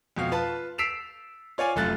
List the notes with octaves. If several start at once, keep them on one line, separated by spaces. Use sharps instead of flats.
F2 B2 F5
F4 B4 A5
E6 B6 C7 D7 E7 F7
F4 C#5 D5 G#5
F1 F#2 A3 F4 F#6 A6